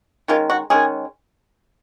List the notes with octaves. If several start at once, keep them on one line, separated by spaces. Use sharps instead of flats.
D#3 G#3 C#4 F4
F#4
D#3 G#3 C#4 G#4